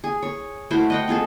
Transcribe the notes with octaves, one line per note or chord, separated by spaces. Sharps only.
G#4
C#5
A3 E4 F#4 C5
D#5 F#5 G5
C4 F4 G#4 A4